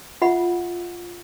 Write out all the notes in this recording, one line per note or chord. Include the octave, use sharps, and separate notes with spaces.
F4 E5 F#5 B5